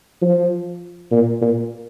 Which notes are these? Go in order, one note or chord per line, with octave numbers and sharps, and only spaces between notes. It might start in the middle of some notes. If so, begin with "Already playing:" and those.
F3
A#2
A#2